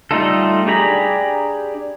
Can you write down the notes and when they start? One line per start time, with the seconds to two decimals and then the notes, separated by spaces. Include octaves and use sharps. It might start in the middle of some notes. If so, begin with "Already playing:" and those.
0.11 G3 A3 D#4 F4 A4
0.67 D4 G4 G#4 A#5 B5